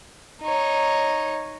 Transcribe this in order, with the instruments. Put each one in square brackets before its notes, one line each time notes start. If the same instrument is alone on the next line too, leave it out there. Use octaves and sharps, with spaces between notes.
[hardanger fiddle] D#4 C#5